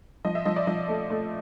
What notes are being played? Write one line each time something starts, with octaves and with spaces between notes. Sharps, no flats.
F3 D#5
E5
F3 D#5
D5
F3 D#5
A3
A3